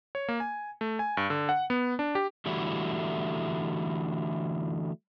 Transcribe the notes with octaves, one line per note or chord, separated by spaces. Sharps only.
C#5
A#3
G#5
A3
G#5
G2
D3
F#5
B3
D4
G4
D3 E3 G3 A3 E4 F#4